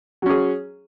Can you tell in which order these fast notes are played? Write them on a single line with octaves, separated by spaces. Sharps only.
F#3 C#4 G#4